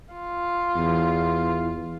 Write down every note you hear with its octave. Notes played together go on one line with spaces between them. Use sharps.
F4
E2